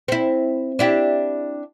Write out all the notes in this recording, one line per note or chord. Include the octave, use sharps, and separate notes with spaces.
C4 E4
D4 E4 G4